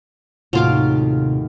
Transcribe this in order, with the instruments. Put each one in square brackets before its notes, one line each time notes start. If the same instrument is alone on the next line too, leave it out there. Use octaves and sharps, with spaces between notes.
[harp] D#2 A2 A3 [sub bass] C3 [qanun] F#3 F4 D6